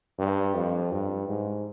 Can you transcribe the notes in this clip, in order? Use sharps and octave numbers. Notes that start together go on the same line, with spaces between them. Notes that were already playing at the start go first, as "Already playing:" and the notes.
G2
F2
G2
G#2